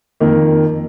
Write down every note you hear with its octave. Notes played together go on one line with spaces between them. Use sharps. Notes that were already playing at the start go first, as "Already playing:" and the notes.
F2 D#3 A#3